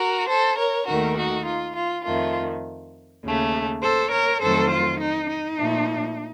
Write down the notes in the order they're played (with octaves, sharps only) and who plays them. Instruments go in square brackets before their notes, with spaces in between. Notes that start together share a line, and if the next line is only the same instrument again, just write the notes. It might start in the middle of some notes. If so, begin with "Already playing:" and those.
Already playing: [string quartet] F#4 A#4
A4 C5
A#4 C#5
D#2 D#3 A3 F#4 A#4
D#4 F#4
F4
F4
F2 D#3 A3 F4
D#2 C#3 A3
A4 C5
A#4 C#5
F2 D#3 F#3 A3 A4 C5
F4
D#4
D#4
A#2 F3 A3